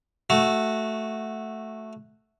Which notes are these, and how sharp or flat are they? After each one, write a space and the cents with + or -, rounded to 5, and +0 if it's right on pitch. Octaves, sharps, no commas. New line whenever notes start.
A3 +0 F#4 +0